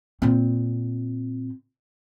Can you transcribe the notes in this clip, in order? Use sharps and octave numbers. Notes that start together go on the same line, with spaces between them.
A#2 C4